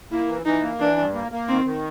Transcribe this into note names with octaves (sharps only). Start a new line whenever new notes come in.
A#3 E4
E3
E3 D#4
A#3
E3 D4
G2
A#3
A#3
D#3 C4
D#3